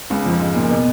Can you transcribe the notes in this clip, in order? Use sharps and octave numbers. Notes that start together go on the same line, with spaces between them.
C#2 C#3
F2 F3
G#2 G#3
A#2 A#3
B2 B3